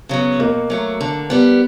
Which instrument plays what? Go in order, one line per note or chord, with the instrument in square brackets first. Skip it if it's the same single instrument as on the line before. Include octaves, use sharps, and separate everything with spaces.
[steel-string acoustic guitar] C#3 F#3 B3
[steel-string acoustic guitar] B2 [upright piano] A#3
[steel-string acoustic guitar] F#3 A3
D3
G3 B3